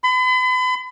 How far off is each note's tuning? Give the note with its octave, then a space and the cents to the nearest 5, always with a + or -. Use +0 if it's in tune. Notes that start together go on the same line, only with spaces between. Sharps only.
B5 +40